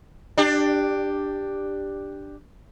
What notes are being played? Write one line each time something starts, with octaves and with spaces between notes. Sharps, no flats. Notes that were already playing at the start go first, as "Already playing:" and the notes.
D4 G4